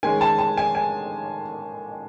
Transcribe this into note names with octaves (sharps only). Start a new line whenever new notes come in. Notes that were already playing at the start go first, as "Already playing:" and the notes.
D#3 G#3 C#4 G#5
A5
A5
G#5
G#5